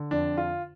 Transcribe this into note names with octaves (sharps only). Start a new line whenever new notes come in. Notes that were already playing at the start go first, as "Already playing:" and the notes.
Already playing: D3
F2 D4
F4